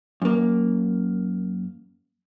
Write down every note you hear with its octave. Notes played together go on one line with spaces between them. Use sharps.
F#2 A#3